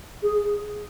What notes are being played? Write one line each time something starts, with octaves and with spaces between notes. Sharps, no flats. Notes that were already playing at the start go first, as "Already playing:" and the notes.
G#4